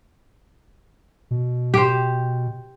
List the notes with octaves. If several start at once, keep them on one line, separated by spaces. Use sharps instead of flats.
B2
G4 C5